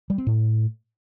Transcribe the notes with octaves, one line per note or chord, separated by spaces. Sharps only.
G3
C4
A2